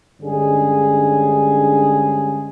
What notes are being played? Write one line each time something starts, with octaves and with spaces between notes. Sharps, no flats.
G2 D3 G#3 C#4 G#4